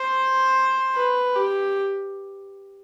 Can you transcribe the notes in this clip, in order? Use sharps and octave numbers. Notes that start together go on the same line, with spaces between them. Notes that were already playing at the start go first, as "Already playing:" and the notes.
Already playing: C5
B4
G4